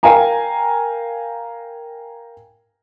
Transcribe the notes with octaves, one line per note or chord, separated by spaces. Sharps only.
A#4 F5 G5 G#5 A#5